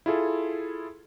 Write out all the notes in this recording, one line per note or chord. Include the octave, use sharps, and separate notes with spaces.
E4 F4 G#4 A4